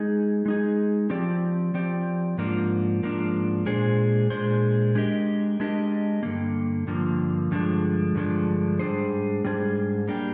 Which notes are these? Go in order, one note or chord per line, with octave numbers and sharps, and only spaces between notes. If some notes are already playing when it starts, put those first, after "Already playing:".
Already playing: G#3 D#4 G#4
G#3 D#4 G#4
F3 C4 G4 D5
F3 C4 G4 D5
G#2 F3 A#3 D4
G#2 F3 A#3 D4
A#2 G#3 D4 G#4 C5
A#2 G#3 D4 G#4 C5
G#3 D4 G4 A#4 D#5
G#3 D4 G4 A#4 D#5
G2 D3 F3 A#3
G2 D3 F3 A#3
G2 D3 F3 G#3 D4
G2 D3 F3 G#3 D4
G#2 G3 D4 G#4 C5
G#2 G3 D4 G#4 C5
G3 A#3 D4 G4